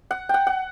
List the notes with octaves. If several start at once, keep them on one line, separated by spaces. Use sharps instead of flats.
F#5
F#5 G5
F#5